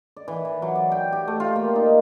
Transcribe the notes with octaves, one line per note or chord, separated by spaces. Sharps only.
D5
E3
E3
F#3
D5
G5
G4
A3
F4
A#3
D#4